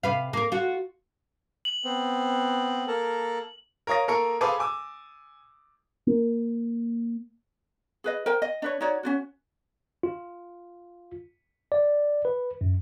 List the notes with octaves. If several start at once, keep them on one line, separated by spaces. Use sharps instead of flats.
C3 B4 F5
A#3 A#4
F4 F#4
F#7
B3 C4
A#3 A4 A#4
A#4 C#5 F5 D#6 A#6
A#3 A4 A#4 C#6 C#7
G#4 A4 B4 C5 F5 D6
G#5 D6 E6
A#3
G#4 B4 D#5
A#4 C5 G5
D#5
D4 B4 C#5
D#4 F#4 C#5 D5
C#4 F4 F#4
F4
D5
B4
F#2